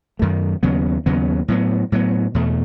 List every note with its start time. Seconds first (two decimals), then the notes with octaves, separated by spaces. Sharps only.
0.19 F#2 D#3 A3
0.63 D#2 C#3 F#3 B3
1.06 D#2 C#3 F#3 B3
1.48 A2 F#3 B3
1.92 A2 F#3 B3
2.34 E2 B2 A3